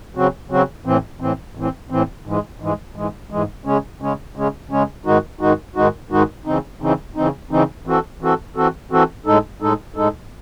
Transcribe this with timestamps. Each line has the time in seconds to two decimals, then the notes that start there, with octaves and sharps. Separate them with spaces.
0.15 C#3 F#3 C4 F#4
0.50 C#3 F#3 C4 F#4
0.85 A2 E3 C4
1.20 A2 E3 C4
1.55 A2 E3 C4
1.90 A2 E3 C4
2.26 G#2 E3 G#3
2.60 G#2 E3 G#3
2.96 G#2 E3 G#3
3.30 G#2 E3 G#3
3.65 C#3 G#3 C#4
4.01 C#3 G#3 C#4
4.36 C#3 G#3 C#4
4.70 C#3 G#3 C#4
5.05 G#2 D#3 G#3 D#4 F#4
5.40 G#2 D#3 G#3 D#4 F#4
5.76 G#2 D#3 G#3 D#4 F#4
6.11 G#2 D#3 G#3 D#4 F#4
6.45 C#3 E3 C4 D#4
6.81 C#3 E3 C4 D#4
7.16 C#3 E3 C4 D#4
7.51 C#3 E3 C4 D#4
7.86 E3 C4 F#4 A4
8.21 E3 C4 F#4 A4
8.56 E3 C4 F#4 A4
8.91 E3 C4 F#4 A4
9.26 A2 G#3 D#4 A4
9.60 A2 G#3 D#4 A4
9.96 A2 G#3 D#4 A4